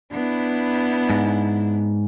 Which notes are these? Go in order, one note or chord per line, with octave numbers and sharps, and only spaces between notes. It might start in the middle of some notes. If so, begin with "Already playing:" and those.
B3 D4 E4
G#2